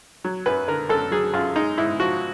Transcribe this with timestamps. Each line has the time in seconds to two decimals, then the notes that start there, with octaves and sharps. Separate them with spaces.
0.24 F#3
0.46 F#2 B4
0.68 D3 A#4
0.89 F#2 A4
1.11 F#3 G#4
1.34 F#2 F4
1.56 G#3 D#4
1.78 G#2 E4
1.99 F3 F#4